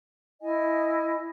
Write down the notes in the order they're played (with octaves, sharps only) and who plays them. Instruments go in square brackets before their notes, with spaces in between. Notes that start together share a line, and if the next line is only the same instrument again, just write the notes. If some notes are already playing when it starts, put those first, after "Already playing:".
[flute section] E4 D#5 G#5